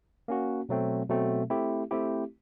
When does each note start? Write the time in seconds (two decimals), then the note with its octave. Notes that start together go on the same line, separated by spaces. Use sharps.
0.28 A#3 C#4 F#4
0.69 B2 F#3 A3 C4
1.09 B2 F#3 A3 C4
1.50 A3 C4 E4 G4
1.91 A3 C4 E4 G4